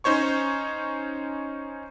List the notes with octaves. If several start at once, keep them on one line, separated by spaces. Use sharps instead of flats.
C#4 D#4 C5 C#5 C#6